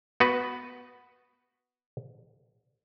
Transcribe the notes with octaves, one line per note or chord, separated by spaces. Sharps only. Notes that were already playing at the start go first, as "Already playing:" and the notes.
B3 F#4 B4